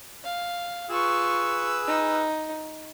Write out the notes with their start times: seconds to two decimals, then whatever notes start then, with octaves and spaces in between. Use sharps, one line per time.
0.24 F5
0.90 F4 G#4 B4 C#6 E6
1.88 D#4